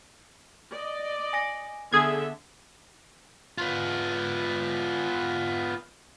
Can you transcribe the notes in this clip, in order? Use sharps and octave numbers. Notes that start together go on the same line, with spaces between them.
D5 D#5
G#5 A#6 D7
D3 B3 G#4 A4 E5 G#6
B3 F4